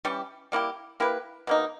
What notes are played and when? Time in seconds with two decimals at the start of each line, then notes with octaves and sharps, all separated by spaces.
0.05 E3 G3 C#4 G4
0.52 G3 A#3 E4 G4
1.00 A#3 E4 G4 B4
1.47 B2 A#3 D#4